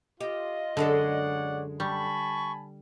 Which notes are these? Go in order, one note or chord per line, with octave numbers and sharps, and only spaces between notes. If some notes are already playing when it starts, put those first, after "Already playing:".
F4 G4 D#5
F#2 D3 G#3 A4 C#5 D5 F#5
G3 G#5 A5 B5 C#6